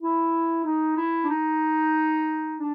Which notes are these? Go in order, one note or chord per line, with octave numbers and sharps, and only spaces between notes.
E4
D#4
E4
D4
D#4
D4